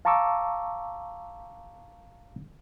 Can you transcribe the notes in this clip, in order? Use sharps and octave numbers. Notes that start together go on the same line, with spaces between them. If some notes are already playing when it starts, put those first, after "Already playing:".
F5 A5 A#5 C#6 D6 E6